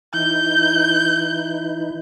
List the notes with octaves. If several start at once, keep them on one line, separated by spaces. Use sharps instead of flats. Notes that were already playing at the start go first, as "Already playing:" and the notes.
E3 D#4 E4 G6